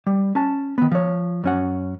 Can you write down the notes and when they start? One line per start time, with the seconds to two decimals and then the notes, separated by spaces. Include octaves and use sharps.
0.07 G3
0.35 C#4 A5
0.78 D#3 B3
0.91 F3 C#5
1.44 F#2 C#4 F#5